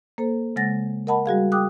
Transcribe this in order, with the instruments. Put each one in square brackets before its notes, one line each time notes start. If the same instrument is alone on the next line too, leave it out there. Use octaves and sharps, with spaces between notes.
[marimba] A#3 A4 C5
C#3 G#3 F#5 A6 A#6
A#4 D#5 F#5 A5 B5
G3 F#4 G#4 F5
G#4 G5 D6 D#6 F#6